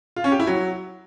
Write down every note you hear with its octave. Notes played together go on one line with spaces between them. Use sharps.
F4
C#4
G4
E4
F#3